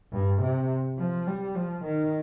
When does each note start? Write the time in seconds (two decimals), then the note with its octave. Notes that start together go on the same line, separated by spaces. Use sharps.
0.12 G2
0.42 C3
0.98 F3
1.27 G3
1.55 F3
1.85 D#3